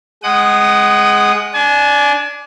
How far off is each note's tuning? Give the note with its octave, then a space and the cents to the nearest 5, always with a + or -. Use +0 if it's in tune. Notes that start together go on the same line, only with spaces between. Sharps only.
G#3 +0 F#5 +25 D#6 -15
D4 -5 G#5 +35